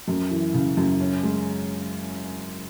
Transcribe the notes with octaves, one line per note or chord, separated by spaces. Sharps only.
F#2
E3
C#3
F#2
C#4
G#3